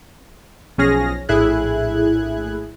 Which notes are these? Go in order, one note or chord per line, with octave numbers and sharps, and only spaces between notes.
B1 F3 C#4 G#4 F6 A#6
A#1 A2 E4 G#4 F#6 G#6